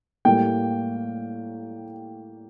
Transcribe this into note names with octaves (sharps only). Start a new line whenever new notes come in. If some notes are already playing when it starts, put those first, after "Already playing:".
A2 G3 A#3 G5